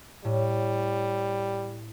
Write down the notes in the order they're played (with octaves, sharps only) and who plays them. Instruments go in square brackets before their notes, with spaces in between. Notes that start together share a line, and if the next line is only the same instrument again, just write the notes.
[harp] A2 [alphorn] G3